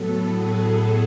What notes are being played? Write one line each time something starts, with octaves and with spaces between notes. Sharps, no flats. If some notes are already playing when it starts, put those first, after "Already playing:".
Already playing: A2 F#3 B3 A4
G#4